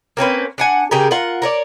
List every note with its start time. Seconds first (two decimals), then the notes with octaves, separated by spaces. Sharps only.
0.17 A#3 C4 C#4 B4
0.58 D4 F#5 G#5
0.91 C#3 G4 G#4 A#4
1.11 F4 A#4 F#5
1.42 A#4 C#5 D5